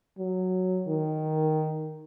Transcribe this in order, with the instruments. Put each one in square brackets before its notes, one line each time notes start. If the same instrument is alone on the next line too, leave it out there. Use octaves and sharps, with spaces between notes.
[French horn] F#3
D#3